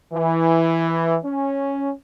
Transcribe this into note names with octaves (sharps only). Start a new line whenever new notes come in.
E3
C#4